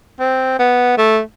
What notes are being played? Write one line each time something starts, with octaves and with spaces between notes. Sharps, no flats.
C4
B3
A3